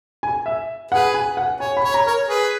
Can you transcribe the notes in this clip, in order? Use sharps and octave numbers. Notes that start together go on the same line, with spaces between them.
G#5
E5
G#4 B4 F#5
G#5
F#5
C#5 G#5
B5
C#5
A#5
A#4 C#5
G#4 B4